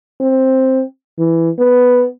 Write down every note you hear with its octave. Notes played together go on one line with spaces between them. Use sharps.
C4
E3
B3